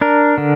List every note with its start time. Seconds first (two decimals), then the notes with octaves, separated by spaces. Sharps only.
0.01 D4 A#4
0.38 D3